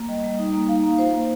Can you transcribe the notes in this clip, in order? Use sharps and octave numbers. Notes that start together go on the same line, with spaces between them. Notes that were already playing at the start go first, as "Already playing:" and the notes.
Already playing: A#3
G3 D#5
G3
D#4
A#3
D#4 F5
A#3
F4 C5
A#3